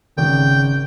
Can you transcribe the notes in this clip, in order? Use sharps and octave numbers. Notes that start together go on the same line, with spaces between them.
G#1 C#3 G5